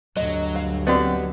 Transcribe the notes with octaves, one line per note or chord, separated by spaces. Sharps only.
D2 G2 F#3 D#5
F5
B3 C4 F#4 G4 D5 D#5